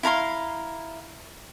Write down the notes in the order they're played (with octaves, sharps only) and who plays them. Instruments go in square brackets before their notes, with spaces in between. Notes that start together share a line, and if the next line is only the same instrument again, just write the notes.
[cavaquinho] E4 F5 A#5 C6